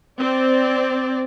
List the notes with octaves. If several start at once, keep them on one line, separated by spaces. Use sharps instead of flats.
C4 D5